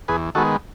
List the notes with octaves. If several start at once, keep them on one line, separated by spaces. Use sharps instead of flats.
E2 G#4 B4
D#3 G#3 B3 F#4 A4